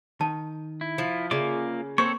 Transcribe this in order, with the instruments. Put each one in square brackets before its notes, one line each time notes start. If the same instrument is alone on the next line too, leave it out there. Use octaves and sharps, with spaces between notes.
[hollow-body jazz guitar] D#3 [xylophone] A5
[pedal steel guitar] E4
[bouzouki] F3
[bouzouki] C#3 [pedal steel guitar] A#3 F4 D6 [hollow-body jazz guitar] D5 E5
[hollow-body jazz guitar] A#3 C5 [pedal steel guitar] C4 A4 C#5 [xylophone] C#6